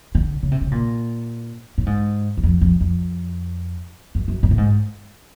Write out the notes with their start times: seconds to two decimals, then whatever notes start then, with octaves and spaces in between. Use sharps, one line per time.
0.15 D3
0.43 C#3
0.52 C3
0.61 C#3
0.71 A#2
1.78 A2
1.86 G#2
2.37 E2
2.43 F2
2.61 F2
2.81 F2
4.15 F#2
4.28 F#2
4.43 G2
4.51 A2
4.58 G#2